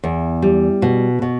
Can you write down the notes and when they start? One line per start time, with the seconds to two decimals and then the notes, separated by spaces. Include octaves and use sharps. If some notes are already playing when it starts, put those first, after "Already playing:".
0.04 E2
0.42 G3
0.82 B2
1.22 B2